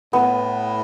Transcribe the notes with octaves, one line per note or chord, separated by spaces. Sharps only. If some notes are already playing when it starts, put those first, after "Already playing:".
A2 B3